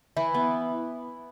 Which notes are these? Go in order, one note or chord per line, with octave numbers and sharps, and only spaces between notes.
E3 E4
B3